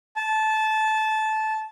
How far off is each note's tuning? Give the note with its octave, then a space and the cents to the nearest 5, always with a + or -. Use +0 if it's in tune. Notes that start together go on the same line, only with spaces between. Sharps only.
A5 -15